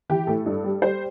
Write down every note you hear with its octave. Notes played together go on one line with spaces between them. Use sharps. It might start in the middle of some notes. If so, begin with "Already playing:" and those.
E3 G4
A2 A4
G2
G3
G3 C5